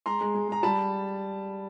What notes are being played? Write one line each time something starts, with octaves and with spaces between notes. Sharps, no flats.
G#3 A#5 C6
G#3
G#3
G#3 A#5
G3 A5 B5